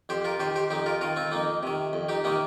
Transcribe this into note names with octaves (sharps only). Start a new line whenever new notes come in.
F2 G4 C5
F4 A#4
D#3 G4 C5
G4 C5
F2 D#4 G4
F4 A#4
D#3 F4 A#4
C4 F4
F2 A#3 D#4
C3 D#3
F2
D#4 G4
C3 D#3 A#3 D#4